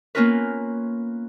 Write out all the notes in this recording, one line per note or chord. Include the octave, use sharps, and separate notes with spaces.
A#3 B3 C#4 F4 A#4 B4